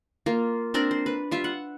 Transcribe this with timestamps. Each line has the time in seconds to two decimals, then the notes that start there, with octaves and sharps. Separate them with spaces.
0.26 A#3 F4
0.74 C4 D4 A#4 D5
0.91 C5
1.06 B4
1.31 G3 F4 E5
1.44 F#5